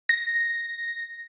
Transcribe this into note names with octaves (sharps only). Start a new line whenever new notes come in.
A#6